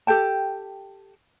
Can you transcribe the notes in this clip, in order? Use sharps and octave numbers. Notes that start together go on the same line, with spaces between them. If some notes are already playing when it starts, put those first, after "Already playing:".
G4 A4 G5 A5